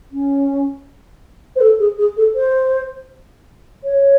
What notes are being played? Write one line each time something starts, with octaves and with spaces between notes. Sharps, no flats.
C#4
C5
A4
G#4
G#4
A4
C5
C#5